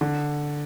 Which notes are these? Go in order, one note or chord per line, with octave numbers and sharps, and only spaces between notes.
D3